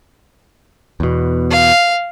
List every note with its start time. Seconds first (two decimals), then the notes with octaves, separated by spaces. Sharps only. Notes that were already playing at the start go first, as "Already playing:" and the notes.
1.00 E2 B2
1.50 F5